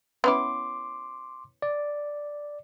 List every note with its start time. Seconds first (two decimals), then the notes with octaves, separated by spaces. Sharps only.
0.24 B3 C#4 E4 C6 D6
1.62 D5